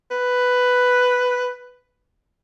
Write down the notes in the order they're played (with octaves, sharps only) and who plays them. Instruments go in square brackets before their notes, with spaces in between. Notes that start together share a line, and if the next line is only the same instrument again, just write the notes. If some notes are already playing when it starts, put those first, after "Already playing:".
[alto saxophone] B4